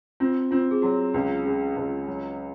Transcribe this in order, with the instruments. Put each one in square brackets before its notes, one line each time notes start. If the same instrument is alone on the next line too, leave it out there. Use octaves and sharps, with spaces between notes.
[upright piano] C4 [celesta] F4
[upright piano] C4 [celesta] F4
[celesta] G#4
[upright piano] F#3 [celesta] F#4
[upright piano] C#2
C#3
C#2
F#3